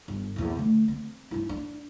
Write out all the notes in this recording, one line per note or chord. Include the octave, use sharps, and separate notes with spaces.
G1
A#1 E2
D3 A3
C4
G2 E4
D4